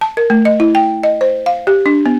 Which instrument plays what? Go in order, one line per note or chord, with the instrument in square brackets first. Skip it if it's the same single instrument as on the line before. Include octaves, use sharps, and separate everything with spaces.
[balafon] A5
A#4
A3
D#5
E4
G5
D#5
C5
F5
G4
D4
B3